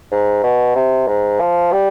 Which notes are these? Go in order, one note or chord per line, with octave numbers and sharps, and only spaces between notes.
G#2
B2
C3
G#2
F3
G3